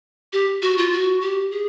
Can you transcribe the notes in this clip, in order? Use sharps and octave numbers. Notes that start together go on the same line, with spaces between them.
G4
F#4
F4
F#4
G4
G#4